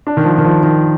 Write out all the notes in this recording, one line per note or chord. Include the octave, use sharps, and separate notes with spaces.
D4
D#3
F3
D#3
F3
D#3